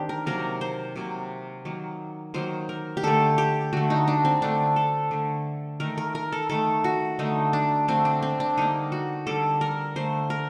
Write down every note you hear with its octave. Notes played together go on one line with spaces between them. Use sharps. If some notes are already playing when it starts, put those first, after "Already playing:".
Already playing: D#3 C4 D4 G4
A#4
C3 F#3 A#3 A#4
C5
C3 F#3 A#3
D#3 F#3 A#3
D#3 F#3 A#3 C5
A#4
G4
D3 A3 A4
G4
D3 A3 F#4
D#4
D4
C4
D3 A3 D4
A4
D3 A3
D#3 A3 A#4
A#4
A#4
A4
D#3 A3 A4
F#4
D3 A3 D#4
D4
D3 A3 C4
D4
C4
D4
D3 G3 A#3 D#4
F#4
D3 G3 A#3 A4
A#4
D3 A3 C5
A#4